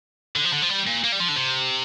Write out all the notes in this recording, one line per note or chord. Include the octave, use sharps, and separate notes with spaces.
D3
F3
D3
F3
G3
A#2
A#3
G3
F3
D3
C3